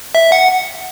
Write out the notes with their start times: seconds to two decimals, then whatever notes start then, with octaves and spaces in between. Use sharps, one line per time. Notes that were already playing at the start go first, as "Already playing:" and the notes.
0.15 E5
0.32 F#5